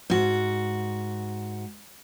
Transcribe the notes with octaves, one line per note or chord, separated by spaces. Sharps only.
G#2 F#4